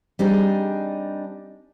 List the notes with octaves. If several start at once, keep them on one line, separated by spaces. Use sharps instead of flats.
G3 C4 D4 D#4 G#4